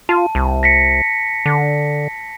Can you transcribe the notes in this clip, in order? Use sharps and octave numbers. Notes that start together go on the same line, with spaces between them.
F4 A5
C2
A#6 B6 C#7
D3